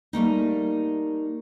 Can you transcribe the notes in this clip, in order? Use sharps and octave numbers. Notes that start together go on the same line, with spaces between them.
G3 A3 A#3 D#4